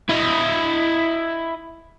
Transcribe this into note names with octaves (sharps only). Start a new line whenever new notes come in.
E4 D#5